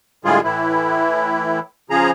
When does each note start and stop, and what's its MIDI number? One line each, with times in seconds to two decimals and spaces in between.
0.25 0.40 45
0.25 0.40 50
0.25 0.40 55
0.25 0.40 56
0.25 0.40 65
0.25 0.40 68
0.44 1.59 45
0.44 1.59 52
0.44 1.59 64
1.90 2.11 49
1.90 2.11 53
1.90 2.11 68
1.90 2.11 82